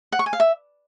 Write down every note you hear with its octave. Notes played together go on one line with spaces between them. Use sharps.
F#5
C#6
G#5
F5
E5